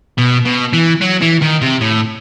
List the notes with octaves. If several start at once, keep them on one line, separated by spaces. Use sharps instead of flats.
B2
B2
E3
F#3
E3
D#3
C3
A2